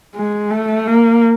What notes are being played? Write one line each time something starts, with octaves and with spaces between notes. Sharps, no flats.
G#3
A3
A#3